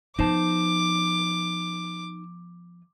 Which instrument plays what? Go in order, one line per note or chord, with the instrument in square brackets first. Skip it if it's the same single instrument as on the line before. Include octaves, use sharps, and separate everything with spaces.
[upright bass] F3 B3 [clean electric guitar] D#4 C5 A5 [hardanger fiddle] D6